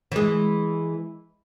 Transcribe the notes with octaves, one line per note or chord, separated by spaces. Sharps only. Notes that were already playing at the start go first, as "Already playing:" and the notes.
E3 G#3